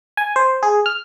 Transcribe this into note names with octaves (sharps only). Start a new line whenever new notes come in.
G#5
C5
G#4
F6